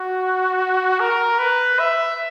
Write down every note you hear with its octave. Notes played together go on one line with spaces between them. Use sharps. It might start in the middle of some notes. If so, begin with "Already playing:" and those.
Already playing: F#4
A#4
B4
E5